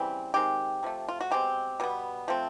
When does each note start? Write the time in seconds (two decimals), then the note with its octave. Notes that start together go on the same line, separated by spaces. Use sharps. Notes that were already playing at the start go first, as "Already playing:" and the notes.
Already playing: C#3 E3 G3 C4
0.34 D#3 G#3 C4 G4
0.83 C3 F3 A3
1.09 F4
1.21 F#4
1.31 B2 G#3 C4 G4
1.80 B2 G3 B3
2.28 F3 A3 C4